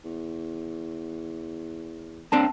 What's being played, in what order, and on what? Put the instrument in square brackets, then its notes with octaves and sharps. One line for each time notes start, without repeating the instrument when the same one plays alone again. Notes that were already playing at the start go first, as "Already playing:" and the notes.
[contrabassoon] E2
[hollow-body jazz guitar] A#3 C4 D4 [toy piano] A5